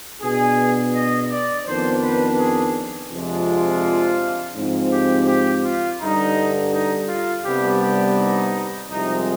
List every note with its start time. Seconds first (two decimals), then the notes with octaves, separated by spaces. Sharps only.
0.22 B2 B3 D4 G#4
0.95 D#5
1.31 D5
1.66 F2 D#3 B3 D4 C5
2.03 B4
2.38 G#4
3.11 F2 C3 F3 G#3 D4
3.48 F4
4.56 G#2 F3 C4
4.93 G4
5.28 G4
5.65 F4
6.00 G2 D3 G3 D#4
6.73 D#4
7.09 F4
7.45 C2 C3 G3 B3 D4 G4
7.81 G4
8.18 D#4
8.89 C2 C3 F3 G#3 D#4